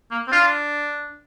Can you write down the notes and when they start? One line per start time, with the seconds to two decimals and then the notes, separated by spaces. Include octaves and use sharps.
0.11 A#3
0.28 C4
0.32 D4 F4